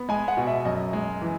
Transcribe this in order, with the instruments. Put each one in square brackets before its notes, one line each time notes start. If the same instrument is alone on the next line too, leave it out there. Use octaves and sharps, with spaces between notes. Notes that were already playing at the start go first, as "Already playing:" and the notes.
Already playing: [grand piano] B3
G#3 G#5
F#5
B2
E5
F#2 D#5
G#3
E3